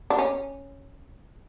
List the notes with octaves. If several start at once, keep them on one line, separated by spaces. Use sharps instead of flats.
D4
C#4